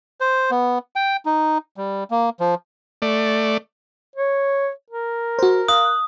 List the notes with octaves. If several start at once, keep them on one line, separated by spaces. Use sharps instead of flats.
C5
B3
G5
D#4
G3
A#3
F3
A3 D5
C#5
A#4
F#4 C5
F5 D#6 F#6